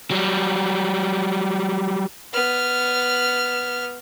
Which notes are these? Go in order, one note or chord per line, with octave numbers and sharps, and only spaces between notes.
F#3 G3
B3 F6